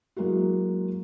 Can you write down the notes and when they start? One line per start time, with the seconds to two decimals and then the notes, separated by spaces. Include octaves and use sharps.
0.17 F#3 G#3 A#3 E4 F#4